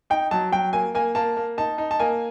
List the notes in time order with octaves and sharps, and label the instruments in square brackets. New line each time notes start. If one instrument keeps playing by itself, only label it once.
[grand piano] D#4 [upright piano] G5
[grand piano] F#3 [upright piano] A5
[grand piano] F#3 [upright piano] G5
[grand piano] A#3 [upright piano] G#5
[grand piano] A#3 [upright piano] G#5
[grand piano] A#3 [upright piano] A5
[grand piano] A#3
[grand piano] D#4 [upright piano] A5
[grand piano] D#4
[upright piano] A5
[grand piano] A#3 [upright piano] G#5